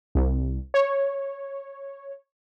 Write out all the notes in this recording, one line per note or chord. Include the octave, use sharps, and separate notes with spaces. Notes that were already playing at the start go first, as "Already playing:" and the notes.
C2
C#5